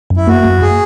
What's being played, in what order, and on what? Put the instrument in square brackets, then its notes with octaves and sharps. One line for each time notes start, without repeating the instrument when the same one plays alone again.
[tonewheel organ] F#2
[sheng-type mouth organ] E4
[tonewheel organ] A#3 [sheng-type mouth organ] F#4
[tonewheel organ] F#2
[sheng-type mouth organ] G#4